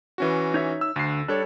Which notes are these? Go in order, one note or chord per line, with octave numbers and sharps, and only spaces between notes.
E3 C#4 F#4
D#4 C#5 E5
E6
D2 D3 C7
G3 D4 A4 C#5